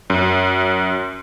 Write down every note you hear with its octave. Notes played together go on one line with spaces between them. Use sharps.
F#2